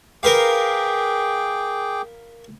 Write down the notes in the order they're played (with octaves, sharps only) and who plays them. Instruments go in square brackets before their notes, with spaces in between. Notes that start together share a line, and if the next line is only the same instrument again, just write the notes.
[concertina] G#4 G5 D6 [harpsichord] A#4 B4 F5